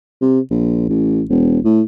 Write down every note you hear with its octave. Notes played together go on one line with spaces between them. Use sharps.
C3
A#1
A1
E1
A2